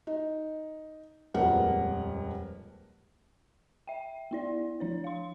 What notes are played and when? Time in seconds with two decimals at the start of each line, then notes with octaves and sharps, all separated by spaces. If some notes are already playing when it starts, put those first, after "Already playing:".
0.07 D#4
1.34 D#1 F2 G#3 A#4 B4 F#5
3.87 E5 G5
4.31 B3 E4 D5
4.80 F3 D4 C#5
5.04 F5 C6